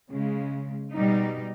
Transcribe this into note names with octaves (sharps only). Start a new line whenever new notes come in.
C#3 G#3
B2 G3 D#4